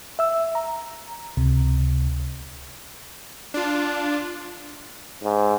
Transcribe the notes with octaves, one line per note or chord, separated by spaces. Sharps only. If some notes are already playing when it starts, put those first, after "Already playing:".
E5 E6
A#5
C#2 C3
D4 F4
G#2